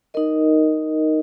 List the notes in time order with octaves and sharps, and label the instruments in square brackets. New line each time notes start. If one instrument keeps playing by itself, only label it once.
[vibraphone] D#4 A#4 D#5